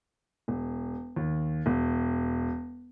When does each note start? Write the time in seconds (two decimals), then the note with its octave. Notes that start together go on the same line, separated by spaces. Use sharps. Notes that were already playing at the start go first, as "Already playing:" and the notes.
0.48 E1
1.16 D#2
1.66 E1